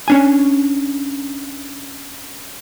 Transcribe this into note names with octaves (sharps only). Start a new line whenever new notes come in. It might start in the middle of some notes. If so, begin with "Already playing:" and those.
C#4 D4 G#5